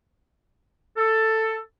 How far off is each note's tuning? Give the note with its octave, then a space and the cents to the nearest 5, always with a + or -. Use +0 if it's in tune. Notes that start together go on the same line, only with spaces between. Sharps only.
A4 +10